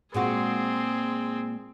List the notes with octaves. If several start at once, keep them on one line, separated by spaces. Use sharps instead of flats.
A#2 G#3 C4 F#4 G#4